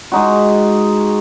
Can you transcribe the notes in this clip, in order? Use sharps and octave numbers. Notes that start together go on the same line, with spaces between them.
G#3 D#4 F#4